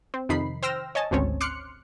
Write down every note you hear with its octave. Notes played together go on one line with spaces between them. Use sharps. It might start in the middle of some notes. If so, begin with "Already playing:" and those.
C4
F2 C3 D#3 D#4 B5 C7
C5 G5 E6 F6 A#6
C#5 D#5 G#5 A5
G#1 D2 C4 C#4 C#5
C6 D6 F6 F#6 C#7